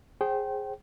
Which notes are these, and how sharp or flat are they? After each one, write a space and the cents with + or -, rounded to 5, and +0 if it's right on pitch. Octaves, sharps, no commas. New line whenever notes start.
G#4 +0 C5 +30 G5 -25